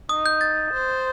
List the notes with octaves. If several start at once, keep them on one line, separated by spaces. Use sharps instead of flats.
D#4 D#6
G6
A6
C5